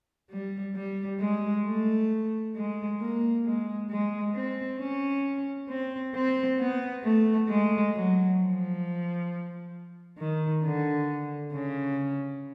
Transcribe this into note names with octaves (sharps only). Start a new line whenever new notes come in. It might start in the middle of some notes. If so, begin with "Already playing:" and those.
G3
G3
G#3
A3
G#3
A#3
G#3
G#3
C4
C#4
C4
C4
B3
A3
G#3
F#3
F3
D#3
D3
C#3